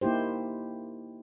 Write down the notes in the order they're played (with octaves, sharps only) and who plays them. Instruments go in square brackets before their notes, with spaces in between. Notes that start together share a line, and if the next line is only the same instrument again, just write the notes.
[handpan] A#3 D#4 E4 G4 C5